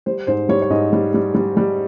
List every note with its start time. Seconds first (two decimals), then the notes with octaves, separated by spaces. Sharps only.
0.06 G3 C5
0.27 G#2 C5
0.49 G3 C#5
0.62 C#5
0.70 G#2 D#5
0.93 G3
1.14 G3
1.34 G3
1.57 G3